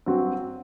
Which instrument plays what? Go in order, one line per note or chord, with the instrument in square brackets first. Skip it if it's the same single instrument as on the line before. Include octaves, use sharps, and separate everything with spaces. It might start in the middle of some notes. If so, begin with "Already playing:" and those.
[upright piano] G2 F#3 C4 F#4